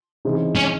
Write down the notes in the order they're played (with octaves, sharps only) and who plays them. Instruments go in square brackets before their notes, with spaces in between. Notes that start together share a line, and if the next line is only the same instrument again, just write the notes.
[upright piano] C#3 E3 C4 D#4
[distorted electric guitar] C#4